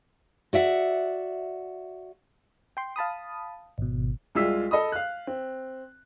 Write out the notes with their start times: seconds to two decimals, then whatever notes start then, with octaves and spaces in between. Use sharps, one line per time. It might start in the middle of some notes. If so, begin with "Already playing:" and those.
0.53 F#4 D5 E5 F#5
2.77 G5 C6
2.96 F5 A5 B5 D#6
3.78 G#1 B2
4.35 C2 G#3 F4 E6 B6
4.71 A4 D#5 B5 D#6
4.92 F5 F#6
5.27 C4